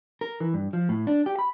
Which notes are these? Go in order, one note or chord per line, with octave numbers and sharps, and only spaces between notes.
A#4
E3
G2
F3
A2
D4
G4
B5